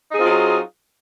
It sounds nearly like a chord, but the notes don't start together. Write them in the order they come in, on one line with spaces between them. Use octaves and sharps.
D#4 G#4 C4 F4 F#3